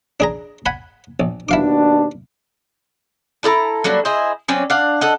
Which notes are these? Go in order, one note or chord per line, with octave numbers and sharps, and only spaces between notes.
D4 G#4 A#5
F#5 G#5 B5
A#1
D#2 B2 D4 E4 F5 D6
D4 E4 A4 A#5
F#3 G3 A#3 D4
E4 G#4 C5 D#5
F#3 C4 C#4 D5
D4 F5 F#5
A4 D#5 F#5